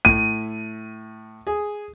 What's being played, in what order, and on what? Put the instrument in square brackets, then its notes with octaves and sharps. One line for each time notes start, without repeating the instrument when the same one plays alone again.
[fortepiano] A2 [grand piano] D#7
[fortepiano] G#4